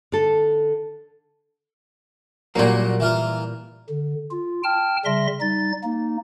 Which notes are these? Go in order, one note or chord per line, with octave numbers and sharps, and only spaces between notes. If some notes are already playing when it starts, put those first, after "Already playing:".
D3 A4
A#2 F#3 G3 A#3 F#4
E3 F4 A#4
D3
F4
G5 A5 F6
C#3 G3 E5 C6 A#6
G3 D#4 A6
A#3 D#4